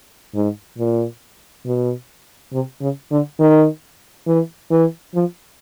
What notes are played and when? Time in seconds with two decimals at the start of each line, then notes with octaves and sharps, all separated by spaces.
0.35 G#2
0.78 A#2
1.66 B2
2.53 C3
2.81 C#3
3.11 D3
3.39 D#3
4.26 E3
4.71 E3
5.15 F3